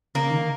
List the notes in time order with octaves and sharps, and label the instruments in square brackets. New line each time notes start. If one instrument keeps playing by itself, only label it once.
[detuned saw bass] C#3 [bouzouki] A#3
[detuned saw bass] D#3